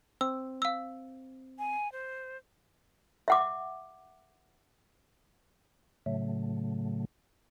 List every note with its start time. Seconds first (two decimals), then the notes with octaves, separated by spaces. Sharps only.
0.21 C4 E6
0.62 F5 E6
1.59 G#5
1.92 C5
3.28 E5 F#5 D6
6.06 A2 C#3 F#3 A3